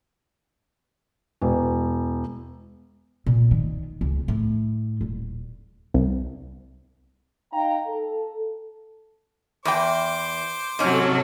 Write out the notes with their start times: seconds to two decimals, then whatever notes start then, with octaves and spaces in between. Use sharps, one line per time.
1.42 E1
3.26 A#2
3.51 D#3
4.01 C#2
4.28 A2
5.01 D#1
5.94 C2
7.52 D#4 F5 G5 A#5
7.87 A4
9.65 E2 C5 G5 D6
10.79 G#2 C3 F#3 C4 C#4 A4 C#5